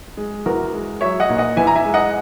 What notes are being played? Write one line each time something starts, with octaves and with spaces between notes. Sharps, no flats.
G#3
E2 F#4 A#4
G#3
F#3 C#5 E5
D#5 F#5
A#2
D#5 F#5
E2 E5 G#5
A#5
E5 G#5
G#3
D#5 F#5